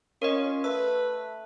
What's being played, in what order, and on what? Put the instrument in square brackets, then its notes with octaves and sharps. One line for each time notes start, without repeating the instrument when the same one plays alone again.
[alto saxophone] C#4 [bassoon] F4 [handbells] A#4 D#5
[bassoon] A3 [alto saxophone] B4 [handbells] E6